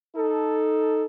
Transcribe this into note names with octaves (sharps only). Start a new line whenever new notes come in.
D#4 A4